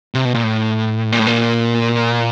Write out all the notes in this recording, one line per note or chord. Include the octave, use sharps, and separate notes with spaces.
C3
B2
A#2
A2
A#2
A2
A#2